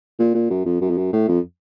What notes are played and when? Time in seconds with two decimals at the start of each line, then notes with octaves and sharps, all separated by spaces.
0.19 A#2
0.35 A#2
0.50 F#2
0.66 F2
0.81 F#2
0.90 F2
0.97 F#2
1.13 A2
1.28 F2